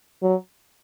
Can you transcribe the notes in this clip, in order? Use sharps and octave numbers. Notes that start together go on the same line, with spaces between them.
F#3